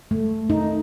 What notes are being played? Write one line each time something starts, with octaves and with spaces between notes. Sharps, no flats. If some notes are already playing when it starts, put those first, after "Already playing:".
A3
D#4